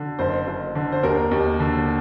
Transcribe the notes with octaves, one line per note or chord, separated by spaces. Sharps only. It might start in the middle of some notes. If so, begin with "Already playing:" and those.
Already playing: D3
F#1 C5
F#1
D3
C5
D#2 A#4
D#2
D3